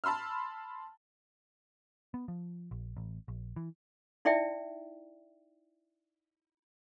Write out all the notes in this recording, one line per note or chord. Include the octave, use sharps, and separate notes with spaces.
A5 B5 C6 E6 F6
B3
F3
A#1
A1
A#1
E3
D#4 E4 D5 E5 G5